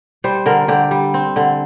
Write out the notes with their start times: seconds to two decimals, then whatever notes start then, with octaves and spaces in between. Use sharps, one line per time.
0.24 G3 C5
0.46 D3 A#4
0.68 D3 G4
0.91 G3
1.14 C4
1.36 D3